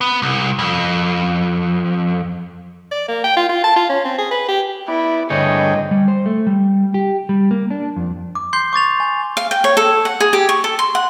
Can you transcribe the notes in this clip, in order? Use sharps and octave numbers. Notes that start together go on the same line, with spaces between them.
B3
C2
F2
D5
A#3
G5
F4
F4
A5
F4
C#4
C4
G#4
B4
G4
B3 E4 D5
D2 G2 D3 G#4 C#5 D#5 G5
G3
C5
A3
G3
G4
G3
A#3
D4
F2
D6
C6 G6 C7 G7
C#6 D6 A6 F7
G#5
F5
G5
C#5
A4
F#5
G#4
G4
C#6
A4
C6
F#5